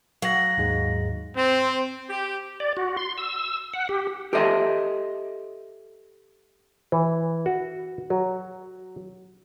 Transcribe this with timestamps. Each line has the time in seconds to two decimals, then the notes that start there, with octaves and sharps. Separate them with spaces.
0.22 F#3 F5 F#5 A#6
0.58 D#2 G#2 G#3
1.36 C4
2.10 G4
2.60 D5
2.77 F#4
2.97 C6
3.18 E6
3.74 F#5
3.89 G4
4.33 G4 A4 C5 D#5 E5
6.92 E3
7.46 F#4
8.10 F#3